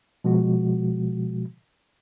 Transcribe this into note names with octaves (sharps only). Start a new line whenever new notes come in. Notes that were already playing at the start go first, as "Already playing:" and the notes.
B2 F3 G#3 F#4